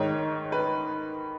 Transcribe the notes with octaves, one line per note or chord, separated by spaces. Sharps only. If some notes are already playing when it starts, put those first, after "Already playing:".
Already playing: G#2 D#3 G#3 C#5
B4